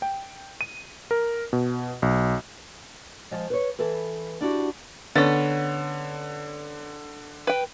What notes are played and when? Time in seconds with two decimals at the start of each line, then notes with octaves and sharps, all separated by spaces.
0.02 G5
0.61 D#7
1.11 A#4
1.53 B2
2.02 B1
3.31 F3 G#3
3.50 B4 C#5
3.79 E3 A4 B4
4.41 D4 E4 F#4 G4
5.15 D3 B3 C#4 A6
7.47 B4 G5